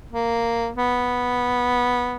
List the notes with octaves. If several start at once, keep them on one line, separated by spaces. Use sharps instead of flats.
A#3
B3